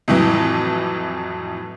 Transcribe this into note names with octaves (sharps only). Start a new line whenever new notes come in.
F2 A2 E3 F#3